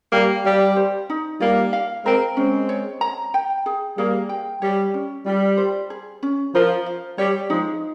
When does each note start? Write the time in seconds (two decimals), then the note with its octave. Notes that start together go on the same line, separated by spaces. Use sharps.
0.13 G3 A#3 G4
0.44 G3 F5
0.76 C5
1.10 D#4
1.40 G3 A#3 F4
1.73 F5
2.05 G#3 C4 A#4
2.37 G#3 C4 C#4
2.69 C#5
3.01 A#5
3.34 G5
3.66 G#4
3.97 G3 A#3 G#4
4.29 G5
4.62 G3 C#5
4.94 C#4
5.26 G3 F4
5.57 C5
5.90 G#4
6.23 C#4
6.54 F3 A#4
6.86 F5
7.18 G3 C#5
7.50 F3 G#3 D#4